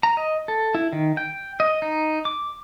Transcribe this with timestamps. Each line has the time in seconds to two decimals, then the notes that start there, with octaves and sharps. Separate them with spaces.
0.03 A#5
0.17 D#5
0.48 A4
0.75 E4
0.93 D#3
1.17 G5
1.60 D#5
1.82 D#4
2.25 D6